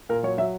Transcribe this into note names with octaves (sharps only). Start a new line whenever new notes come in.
A#2 A#4
F#3 C#5
F#3 E5